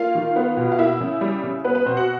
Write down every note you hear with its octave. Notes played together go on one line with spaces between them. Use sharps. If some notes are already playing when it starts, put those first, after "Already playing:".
Already playing: A#3 F4 F5
D#3
B3
B2
F5
A#3 E4 E5
C#3
G3
C#3
B3 B4
B4
B2 C4 C5
F#4 F#5